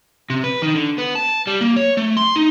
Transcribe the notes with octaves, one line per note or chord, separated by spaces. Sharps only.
C3
B4
D#3
D3
B3
A5
G3
A#3
C#5
A3
C6
D#4